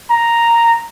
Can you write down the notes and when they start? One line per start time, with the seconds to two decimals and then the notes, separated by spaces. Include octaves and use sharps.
0.11 A#5